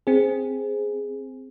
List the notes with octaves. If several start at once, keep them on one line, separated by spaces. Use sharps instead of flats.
C4 G#4